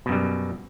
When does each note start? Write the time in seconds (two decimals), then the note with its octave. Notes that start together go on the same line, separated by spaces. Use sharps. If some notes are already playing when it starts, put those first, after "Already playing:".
0.06 B2
0.09 F#2
0.12 G3